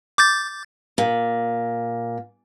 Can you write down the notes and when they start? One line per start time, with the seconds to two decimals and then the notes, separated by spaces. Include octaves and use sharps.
0.18 D6 G6 A6
0.98 A#2